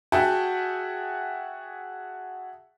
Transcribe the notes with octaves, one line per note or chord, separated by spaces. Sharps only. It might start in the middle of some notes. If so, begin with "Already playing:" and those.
F#4 G#4 E5 F#5 G5 A5